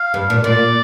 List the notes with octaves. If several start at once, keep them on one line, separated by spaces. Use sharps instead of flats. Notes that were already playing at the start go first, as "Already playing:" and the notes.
Already playing: F5
G2
A#2
A#2 D5